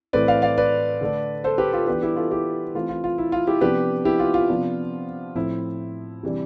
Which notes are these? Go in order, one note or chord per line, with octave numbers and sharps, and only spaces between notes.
A2 E3 A3 C4 B4 D5
D5 F5
D5 F5
B4 D5
D3 A3 D4
A4 C5
G4 B4
F4 A4
E3 B3 D4 G4 B4
E4 G4
F4 A4
E4 G4
E3 A3 C4 F4
F4
F4
E4
F4
E4 G4
C3 F3 B3 D4 G4 B4
E4 G4
F4
F4
C3 F3 B3 D4
A2 F3 C4 E4
C3 E3 G3 D4